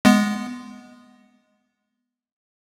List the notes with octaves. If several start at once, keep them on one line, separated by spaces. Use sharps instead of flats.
G#3 B3